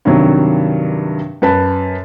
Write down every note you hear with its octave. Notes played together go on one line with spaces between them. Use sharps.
G2 C3 D#3 F#3
F#2 B4 A5